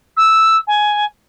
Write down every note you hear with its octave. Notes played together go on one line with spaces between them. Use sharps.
E6
G#5